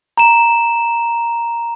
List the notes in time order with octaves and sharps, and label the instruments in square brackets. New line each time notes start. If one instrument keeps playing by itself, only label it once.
[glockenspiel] A#5 E7